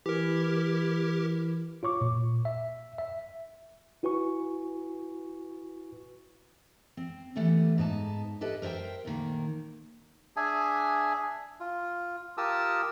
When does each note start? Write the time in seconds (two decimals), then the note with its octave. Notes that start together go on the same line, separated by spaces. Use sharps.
0.06 E3 E4 G4 A#4
1.83 F4 C#5 C#6 D6
2.02 A#2
2.45 E5
2.98 E5
4.03 E4 F#4 B4 G#5 C#6
6.97 C4
7.35 E3 G3 A3 B3 C#4 A4
7.78 G#2 B3 D#4 G#5 A5
8.41 E4 G4 A4 B4 D#5
8.62 A#4 C5 D#5 E5 G5
9.05 D2 A#2 D#3 A#3
10.37 D4 G#4 E5 G#5
11.60 F4
12.38 F4 G4 A#4 A5 D#6 E6